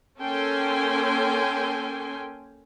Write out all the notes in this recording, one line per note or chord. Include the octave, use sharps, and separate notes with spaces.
A#3 C#4 A4 G5 G#5 C6